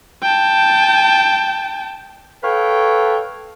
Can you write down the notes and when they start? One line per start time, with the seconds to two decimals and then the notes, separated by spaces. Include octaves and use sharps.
0.22 G5 A5
2.44 A4 B4 C#5 F5 G5